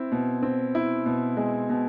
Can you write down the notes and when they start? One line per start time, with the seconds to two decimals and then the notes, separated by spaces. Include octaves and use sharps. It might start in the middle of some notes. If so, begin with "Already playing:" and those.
Already playing: C4 E4
0.12 B2
0.43 C4
0.75 E4
1.06 B2
1.37 G#3
1.70 B2